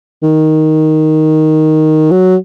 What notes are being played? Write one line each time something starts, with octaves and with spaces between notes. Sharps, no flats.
D#3
F#3